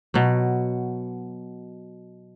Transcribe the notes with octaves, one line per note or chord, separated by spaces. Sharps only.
B2 F#3